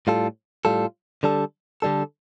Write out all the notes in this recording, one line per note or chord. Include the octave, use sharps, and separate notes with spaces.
A2 G3 F4 A4
A2 G3 F4 A4
D3 G3 D4 A4
D3 G3 D4 A4